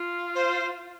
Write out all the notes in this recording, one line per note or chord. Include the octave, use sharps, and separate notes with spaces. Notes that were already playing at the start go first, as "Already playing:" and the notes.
Already playing: F4
C5